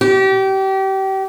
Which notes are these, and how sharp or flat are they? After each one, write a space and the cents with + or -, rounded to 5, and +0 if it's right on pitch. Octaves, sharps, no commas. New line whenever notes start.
G4 -30